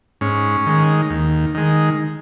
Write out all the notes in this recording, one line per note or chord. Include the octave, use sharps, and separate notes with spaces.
G#2 C#4
D#3 G#3
D#2
D#3 G#3